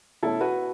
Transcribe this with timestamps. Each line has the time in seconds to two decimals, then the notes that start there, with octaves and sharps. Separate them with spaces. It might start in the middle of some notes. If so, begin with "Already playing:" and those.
0.23 B2 A3 C#4 E4 A4
0.41 F#4 B4